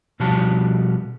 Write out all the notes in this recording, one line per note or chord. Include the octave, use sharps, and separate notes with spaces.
B2 F3 G3 F#4 A5